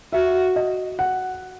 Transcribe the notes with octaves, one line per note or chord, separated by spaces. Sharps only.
F#4 E5
D#5
F#5